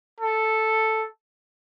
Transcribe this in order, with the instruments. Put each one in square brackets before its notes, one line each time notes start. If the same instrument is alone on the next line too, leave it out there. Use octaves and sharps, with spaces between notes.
[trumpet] A4